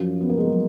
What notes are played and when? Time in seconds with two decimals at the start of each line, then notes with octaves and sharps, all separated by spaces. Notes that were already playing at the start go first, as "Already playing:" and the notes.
Already playing: F#2 F3
0.21 B3
0.29 A#3
0.38 G#3
0.45 F#3